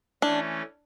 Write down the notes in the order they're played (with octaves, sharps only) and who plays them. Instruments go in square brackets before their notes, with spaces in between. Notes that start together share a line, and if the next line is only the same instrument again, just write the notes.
[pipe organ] E3 A3 C#4 [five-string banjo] D4